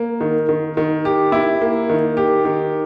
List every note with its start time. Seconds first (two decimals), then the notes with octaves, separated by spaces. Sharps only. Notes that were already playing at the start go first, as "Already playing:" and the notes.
Already playing: A#3
0.21 D#3
0.49 D#3
0.77 D#3
1.05 G4
1.32 E4
1.61 A#3
1.89 D#3
2.17 G4
2.45 D#3